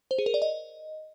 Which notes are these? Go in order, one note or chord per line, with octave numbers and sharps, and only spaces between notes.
C5
G#4
A#4
D5
D#5